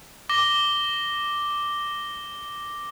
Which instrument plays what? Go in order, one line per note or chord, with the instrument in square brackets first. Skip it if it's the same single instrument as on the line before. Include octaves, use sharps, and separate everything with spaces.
[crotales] D6 A#6 G7